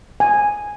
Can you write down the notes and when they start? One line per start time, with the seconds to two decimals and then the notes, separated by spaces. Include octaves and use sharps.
0.20 G#5